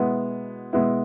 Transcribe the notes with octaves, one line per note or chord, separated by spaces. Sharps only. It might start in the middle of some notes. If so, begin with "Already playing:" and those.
Already playing: B2 G#3 B3 E4
B2 G#3 B3 E4